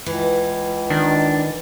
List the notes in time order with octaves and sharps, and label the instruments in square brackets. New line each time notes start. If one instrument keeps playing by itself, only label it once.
[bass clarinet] C#2 [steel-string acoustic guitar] E3
[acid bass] D#3 [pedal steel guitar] D4